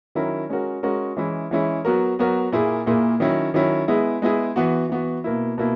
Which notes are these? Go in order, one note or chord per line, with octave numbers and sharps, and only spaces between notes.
D#3 F#3 C#4 E4 A#4
G#3 C#4 F#4 A#4
G#3 C#4 F#4 A#4
E3 G#3 C#4 E4
E3 G#3 C#4 E4
F#3 B3 F#4 A#4
F#3 B3 F#4 A#4
A#2 A#3 E4 G#4
A#2 A#3 E4 G#4
D#3 F#3 C#4 E4
D#3 F#3 C#4 E4
G#3 B3 E4 G#4
G#3 B3 E4 G#4
E3 B3 F#4
E3 B3 F#4
B2 A#3 E4
B2 A#3 E4